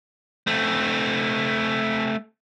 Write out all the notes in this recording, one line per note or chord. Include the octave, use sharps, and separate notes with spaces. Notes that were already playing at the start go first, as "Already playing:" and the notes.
A3 C4